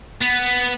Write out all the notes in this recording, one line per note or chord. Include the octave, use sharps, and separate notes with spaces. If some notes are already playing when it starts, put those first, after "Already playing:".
B3